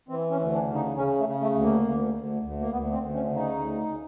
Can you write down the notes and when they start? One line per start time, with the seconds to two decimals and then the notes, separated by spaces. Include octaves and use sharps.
0.09 E3 C4
0.31 C#4
0.39 D2
0.53 D4
0.68 C#3
0.74 D#4
0.96 C#3 C#4
1.18 A3
1.26 C#3
1.41 A3
1.54 D2
1.62 A#3
1.84 D2
2.14 D2
2.43 D2
2.60 A#3
2.71 D2 B3
2.92 C4
3.00 D2
3.14 C#4
3.29 C#3
3.36 D#4
3.59 D2